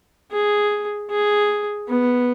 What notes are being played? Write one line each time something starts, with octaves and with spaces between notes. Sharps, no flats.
G#4
G#4
B3